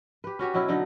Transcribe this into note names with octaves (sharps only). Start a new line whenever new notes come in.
G4 B4
C#4 F#4 G4 C#5
B2 F#3 C#4 E4
D3 F#3 D#4